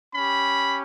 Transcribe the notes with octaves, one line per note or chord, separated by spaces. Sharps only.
C#4 G4 B5